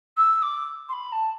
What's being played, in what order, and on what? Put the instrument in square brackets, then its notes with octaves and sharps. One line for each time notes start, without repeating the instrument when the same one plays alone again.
[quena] E6
D6
C6
B5
A5